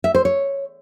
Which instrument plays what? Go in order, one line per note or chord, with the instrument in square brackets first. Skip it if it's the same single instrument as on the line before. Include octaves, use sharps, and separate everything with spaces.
[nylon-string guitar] E5
C5
C#5